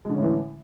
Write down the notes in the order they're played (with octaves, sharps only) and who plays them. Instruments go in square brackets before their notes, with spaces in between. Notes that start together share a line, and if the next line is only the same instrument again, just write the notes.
[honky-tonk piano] G#3
D3
C#4
A2
E3